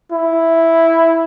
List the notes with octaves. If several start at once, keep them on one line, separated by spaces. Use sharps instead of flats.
E4